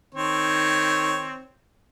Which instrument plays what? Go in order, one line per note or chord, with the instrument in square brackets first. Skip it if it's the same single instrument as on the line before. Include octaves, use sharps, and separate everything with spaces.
[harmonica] D#3 C4 C#5